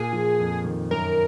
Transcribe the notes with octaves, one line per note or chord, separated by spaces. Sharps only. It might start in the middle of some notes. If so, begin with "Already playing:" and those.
Already playing: A#2 G#4
F3
F2
D#3
F#2 A#4